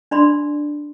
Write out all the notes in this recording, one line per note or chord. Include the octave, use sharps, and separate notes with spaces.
D4 D5 B5 C6